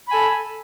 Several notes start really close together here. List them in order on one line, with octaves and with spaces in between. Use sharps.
B5 G#5 A4